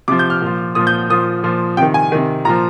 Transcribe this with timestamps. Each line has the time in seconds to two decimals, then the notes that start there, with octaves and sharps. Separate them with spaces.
0.08 C3 F3 D6
0.19 G6
0.30 F6
0.42 A#2 F3
0.75 A#2 F3 D#6
0.87 G6
1.10 A#2 F3 D#6
1.43 A#2 F3
1.77 C3 D#3 G5
1.94 G#5
2.12 C3 D#3
2.45 A#2 F3 A#5